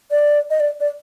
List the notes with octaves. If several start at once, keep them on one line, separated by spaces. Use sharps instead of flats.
D5
D#5
D5
D5